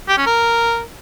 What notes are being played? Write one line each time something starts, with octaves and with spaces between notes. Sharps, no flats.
G4
C#4
A#4